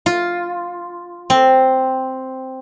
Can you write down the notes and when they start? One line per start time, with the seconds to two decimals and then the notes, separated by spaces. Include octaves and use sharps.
0.06 F4
1.30 C4